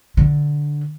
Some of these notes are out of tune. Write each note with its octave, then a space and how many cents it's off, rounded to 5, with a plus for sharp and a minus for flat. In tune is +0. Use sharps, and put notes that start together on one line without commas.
D3 +0